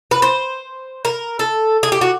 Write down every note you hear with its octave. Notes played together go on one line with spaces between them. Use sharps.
B4
C5
A#4
A4
G#4
G4
F#4